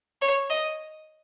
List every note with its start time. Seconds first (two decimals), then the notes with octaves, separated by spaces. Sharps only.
0.21 C#5
0.50 D#5